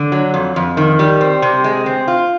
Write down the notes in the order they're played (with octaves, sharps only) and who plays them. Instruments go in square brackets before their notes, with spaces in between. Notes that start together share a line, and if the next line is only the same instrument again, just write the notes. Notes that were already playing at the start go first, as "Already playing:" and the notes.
Already playing: [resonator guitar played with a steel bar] D3
F#3
F2
F2
D#3
G3
C4
C3
G#3
C4
F4